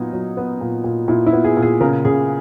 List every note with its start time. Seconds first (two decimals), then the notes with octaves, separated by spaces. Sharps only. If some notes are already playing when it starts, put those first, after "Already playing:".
Already playing: A#2 F#3 B3 D#4
0.13 F#3
0.37 B3
0.61 A#2
0.84 A#2
1.08 A#2 E4
1.26 E4
1.33 B3
1.44 G#4
1.57 A#2
1.62 G#4
1.81 C#3 A#4
2.05 C#3 G#4